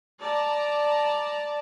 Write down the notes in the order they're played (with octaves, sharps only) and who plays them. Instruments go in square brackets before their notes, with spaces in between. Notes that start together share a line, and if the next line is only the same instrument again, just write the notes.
[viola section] D5 A5 A#5